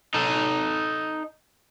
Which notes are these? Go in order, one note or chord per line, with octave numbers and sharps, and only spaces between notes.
D#4 A4